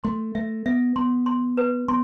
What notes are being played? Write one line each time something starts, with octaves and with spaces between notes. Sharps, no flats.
A3 C6
A3 E5
B3 E5
B3 C6
C6
B4
B3 C6